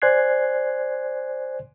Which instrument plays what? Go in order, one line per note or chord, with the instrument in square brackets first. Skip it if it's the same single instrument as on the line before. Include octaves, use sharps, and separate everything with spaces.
[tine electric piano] C5 D5 G#5 F#6 G#6 C7